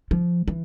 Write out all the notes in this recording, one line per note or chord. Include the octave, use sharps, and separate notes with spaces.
F3
E3